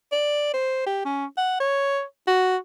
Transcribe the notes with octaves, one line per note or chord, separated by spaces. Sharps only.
D5
C5
G4
C#4
F#5
C#5
F#4